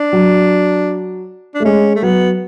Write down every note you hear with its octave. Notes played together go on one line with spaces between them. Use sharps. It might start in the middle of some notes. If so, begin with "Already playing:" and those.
Already playing: D4
F#3
D4
A3
G#3 C#4
A3
F#3 B3